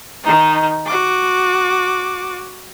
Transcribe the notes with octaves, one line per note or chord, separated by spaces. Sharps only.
D#3 D#4
F#4 D6